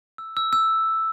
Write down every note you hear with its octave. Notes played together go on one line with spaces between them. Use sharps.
E6
E6
E6